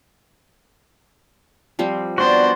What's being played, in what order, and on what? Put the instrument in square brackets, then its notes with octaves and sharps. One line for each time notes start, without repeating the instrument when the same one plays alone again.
[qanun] F3 G3 C4
[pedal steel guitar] B3 D4 F#4 [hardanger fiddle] C5 [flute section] D5